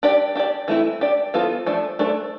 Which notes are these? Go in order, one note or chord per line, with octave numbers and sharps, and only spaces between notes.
D4 G4 D5
D4 G4 D5
E3 A3 C4 E4
D4 G4 D5
E3 B3 F4 A4 C5
F3 A3 D4
A3 D4 A4 C5